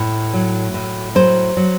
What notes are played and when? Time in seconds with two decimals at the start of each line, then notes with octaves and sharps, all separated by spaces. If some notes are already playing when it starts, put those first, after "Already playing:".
Already playing: A2
0.33 F#3
0.74 A2
1.15 F#3 C5
1.57 F#3